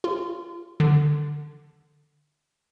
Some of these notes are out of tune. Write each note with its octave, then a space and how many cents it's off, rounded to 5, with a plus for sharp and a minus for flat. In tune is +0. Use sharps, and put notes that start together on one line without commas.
F4 -25
D3 +15